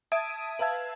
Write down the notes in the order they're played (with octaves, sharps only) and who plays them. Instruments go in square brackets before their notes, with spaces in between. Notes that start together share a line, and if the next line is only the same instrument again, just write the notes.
[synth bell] E5 A5 D#6 G#6 D7 D#7
B4 E5 F5 A5 E6 G#6